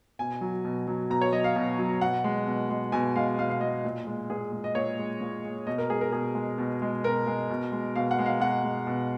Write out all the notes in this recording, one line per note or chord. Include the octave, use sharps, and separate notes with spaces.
B2 G#5
F#3
B2
F#3
B2 A#5
C#5
F#3 D#5
F5
B2
F#3
B2 F#5
G#3
B2
G#3
B2 G#5
G#3 F5
B2 F5
F5
G#3 D#5
A#2
G#3
A#2 G#4
G#3
D#5
A#2 C#5
G#3
A#2
G#3
B2 D#5
A#4
G#3 G#4
A#4
B2 G#4
G#3
B2
G#3
B2 A#4
G#3
B2
G#3
B2 F5
F#5
G#3
F5
B2 F#5
G#3
B2